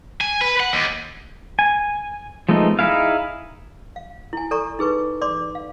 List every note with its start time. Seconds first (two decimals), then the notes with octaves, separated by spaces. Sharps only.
0.21 G#5
0.41 B4
0.60 F#5
0.73 D#2
1.59 G#5
2.49 F3 G#3 A3 B3 D#4
2.79 D#4 E4 G#4 F5
3.96 F5
4.33 E4 G#5
4.51 A4 D5 A#5 C#6
4.79 D#4 G#4 B4 C#6
5.22 D5 C6 D6
5.55 F5